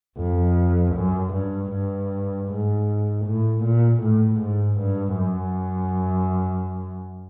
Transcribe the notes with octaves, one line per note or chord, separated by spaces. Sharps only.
F2
F#2
G2
G2
G#2
A2
A#2
A2
G#2
G2
F#2